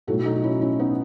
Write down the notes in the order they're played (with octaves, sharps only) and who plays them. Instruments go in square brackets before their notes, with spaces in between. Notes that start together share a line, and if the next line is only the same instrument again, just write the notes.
[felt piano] B1 A2 F#3 A3 F#4 A4
D#4 F#4
C#4 E4
C#4 E4
B3 D#4